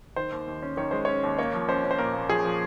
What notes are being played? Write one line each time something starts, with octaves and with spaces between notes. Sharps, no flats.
D#3 C5
D#2
D#2
C#4
D#3 C#5
G#3 C5
C#4 C#5
D#2
A#3 C#5
F3
C#4 C5
C#4
C5
A#2 A#4
A#3
F3 G#4
F3